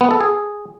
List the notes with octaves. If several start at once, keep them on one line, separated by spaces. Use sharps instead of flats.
B3
A4
G#4